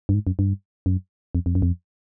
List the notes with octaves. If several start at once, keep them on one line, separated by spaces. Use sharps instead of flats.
G2
G#2
F#2
G2
F#2
F2
F2
F#2
F2